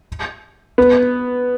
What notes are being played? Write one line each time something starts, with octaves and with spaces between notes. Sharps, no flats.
B3